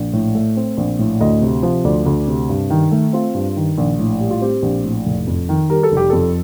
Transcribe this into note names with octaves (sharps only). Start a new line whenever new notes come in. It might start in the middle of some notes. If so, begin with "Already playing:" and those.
Already playing: A#1
A2
A3
C4
A#1
A2
D2 D#5
C3
F3
D2 D5
D2
C3
G2
D#3
A3
C4 F4
G2
D#3
A#1
A2
G3
F4
C4 G4
A#1
A2
F1
F2
D#3
G3 A#4
A4
F1 G4
F2 A4